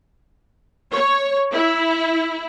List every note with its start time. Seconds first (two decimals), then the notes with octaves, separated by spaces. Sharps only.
0.93 C#5
1.52 E4